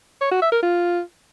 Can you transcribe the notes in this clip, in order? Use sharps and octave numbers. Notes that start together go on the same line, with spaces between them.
C#5
F#4
E5
A#4
F4